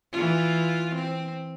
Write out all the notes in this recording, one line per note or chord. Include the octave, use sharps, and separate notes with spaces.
E3 F4
C4